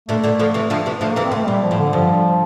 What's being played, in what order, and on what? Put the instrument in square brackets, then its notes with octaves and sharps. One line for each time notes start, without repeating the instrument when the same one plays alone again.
[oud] A#2 D3 [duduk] A3
[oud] A#2 D3
D3 F3
C3 E3
D3 F3
C3 E3
[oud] D3 F3 [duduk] A3
[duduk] A#3
[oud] C3 E3
[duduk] C4
[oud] C3
[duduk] A3
[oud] A#2 [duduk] G3
[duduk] F3
[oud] A2
[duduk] D3
[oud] G2 [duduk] F3